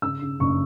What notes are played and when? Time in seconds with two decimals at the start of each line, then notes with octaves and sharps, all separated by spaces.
0.02 C#3 E6
0.21 C#3
0.40 F#1 C#6